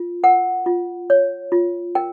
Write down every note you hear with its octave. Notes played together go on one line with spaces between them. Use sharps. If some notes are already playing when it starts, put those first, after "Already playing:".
Already playing: F4
A#4 F#5
F4
C#5
F4
A#4 G5